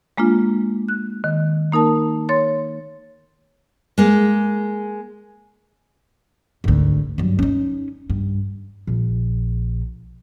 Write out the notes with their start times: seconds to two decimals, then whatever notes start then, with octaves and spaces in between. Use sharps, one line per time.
0.18 G#3 A#3 D4 F4
0.88 F#6
1.24 D#3
1.72 A#3 D#4 A#4 A5
2.29 C#5 C6 A6
3.98 G#3 A#3
6.64 G#1 D2
7.18 G2 F#3
7.39 C#4 D#4
8.10 G2
8.87 A#1